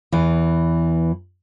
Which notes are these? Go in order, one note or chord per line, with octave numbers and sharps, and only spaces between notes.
E2 E3